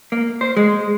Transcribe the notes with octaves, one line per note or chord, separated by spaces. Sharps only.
A#3
C5
G#3